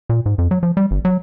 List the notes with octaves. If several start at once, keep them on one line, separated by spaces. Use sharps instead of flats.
A#2
G#2
F2
F#3
F3
G3
G1
F#3